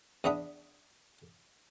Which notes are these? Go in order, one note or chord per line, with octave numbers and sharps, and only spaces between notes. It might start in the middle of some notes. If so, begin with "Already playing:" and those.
E2 B3 D4 E5 D#6